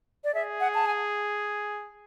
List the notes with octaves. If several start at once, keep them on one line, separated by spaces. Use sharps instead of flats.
D5
G#4 E5
F#5
A5
G#5